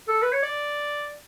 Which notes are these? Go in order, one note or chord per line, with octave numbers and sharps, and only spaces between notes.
A4
B4
C#5
D5